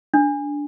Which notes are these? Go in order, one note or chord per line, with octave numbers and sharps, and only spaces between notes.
D4